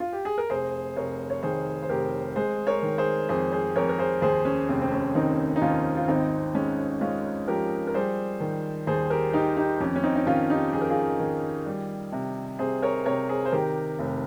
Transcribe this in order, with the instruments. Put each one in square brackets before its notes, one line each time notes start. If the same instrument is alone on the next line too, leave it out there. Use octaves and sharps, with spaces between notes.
[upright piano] F4
G4
G#4
A#4
F1 G#4 C5
F1 A#4 C#5
C#5
D#3 G#4 C5
C5
F1 G4 A#4
G#3 G#4 C5
A#4 C#5
D#3
G#4 C5
F2 G#4 C5
G#4 C5
F2 A#4 C#5
A#4
G#4 C5
D#2 G#4 C5
C#4
F1 C4
C4
C#4
D#3 C4 D#4
D#4
D#2 C#4 F4
F4
G#1 C4 D#4
G#3 C#4
G#3 C#4 F4
F3 G4 A#4
A#4
G3 G#4 C5
D#3
D#2 G#4 C5
G4 A#4
D#3 D#4 G4
D#4 G4
F2 C#4
C#4
C4 D#4
D#4
D#3 C#4 F4
D#4 G4
F2 G#4
A#4
F4 G#4
D#3
G3
C3
C3 G#4 C5
A#4 C#5
C3 A#4 C#5
G#4 C5
C5
D#3 G4 A#4
F1